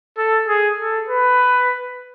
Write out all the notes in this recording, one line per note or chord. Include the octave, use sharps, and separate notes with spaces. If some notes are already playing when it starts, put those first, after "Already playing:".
A4
G#4
A4
B4